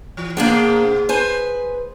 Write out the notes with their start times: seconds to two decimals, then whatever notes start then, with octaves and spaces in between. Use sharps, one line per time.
0.17 E3
0.37 G#2 B2 A#3 D4 G#4 G5
1.09 B4 C5 G#5